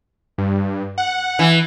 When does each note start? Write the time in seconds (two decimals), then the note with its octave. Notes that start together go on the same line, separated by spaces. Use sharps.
0.38 G2
0.98 F#5
1.39 E3